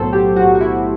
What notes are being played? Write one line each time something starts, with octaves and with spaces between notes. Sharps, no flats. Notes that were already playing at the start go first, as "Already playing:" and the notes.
Already playing: B1 A2 F#3 A4 C5
G4
B1 A2 F#3 F#4
F#4
E4